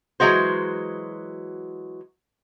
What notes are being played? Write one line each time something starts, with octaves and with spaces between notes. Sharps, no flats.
E3 F#3 G#3 F#4 C5